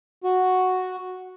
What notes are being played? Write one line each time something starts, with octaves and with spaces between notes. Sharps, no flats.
F#4